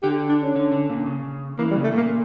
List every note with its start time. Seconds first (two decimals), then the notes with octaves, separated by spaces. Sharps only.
0.03 D3 G4
0.29 D4
0.42 C#4
0.56 D3
0.72 D3
0.90 A#2
1.06 C#3
1.58 E3 A#3
1.71 G3
1.76 C#3
1.84 A3
1.92 A#2 A#3